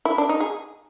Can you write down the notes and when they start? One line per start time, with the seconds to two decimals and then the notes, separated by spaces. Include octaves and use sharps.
0.05 E4
0.18 D4
0.29 D#4
0.40 G#4